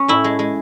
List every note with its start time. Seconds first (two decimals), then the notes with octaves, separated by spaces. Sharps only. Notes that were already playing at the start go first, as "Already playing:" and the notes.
Already playing: C#4
0.08 A2 E4
0.24 G#3
0.39 G#3